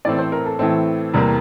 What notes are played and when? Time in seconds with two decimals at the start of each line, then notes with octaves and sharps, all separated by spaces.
0.05 A2 E3 A3 C4 D5
0.19 C5
0.32 A#4
0.46 A4
0.59 A2 E3 A3 C4
1.14 E2 C3 G3 A#3